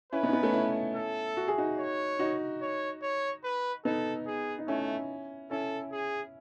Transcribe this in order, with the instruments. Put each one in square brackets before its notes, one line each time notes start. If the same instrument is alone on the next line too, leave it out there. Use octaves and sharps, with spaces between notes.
[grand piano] C#4 E4 [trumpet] B4
[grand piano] B3 D#4
C#4
B3 D#4
A3 C#4
C#4 E4
[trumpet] A4
[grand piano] F#4
G#4
D#4 F#4
[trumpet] C#5
[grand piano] D#4 F#4
[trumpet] C#5
C#5
B4
[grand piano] B3 D#4 [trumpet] A4
[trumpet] G#4
[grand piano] D#4
[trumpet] A3 [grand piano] C#4 E4
[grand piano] C#4 E4 [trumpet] A4
[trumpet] G#4